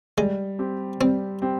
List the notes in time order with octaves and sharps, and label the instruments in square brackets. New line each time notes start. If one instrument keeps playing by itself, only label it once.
[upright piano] G3 [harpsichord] G#3
[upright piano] C4 G4
[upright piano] G3 [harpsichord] C4
[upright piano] C4 G4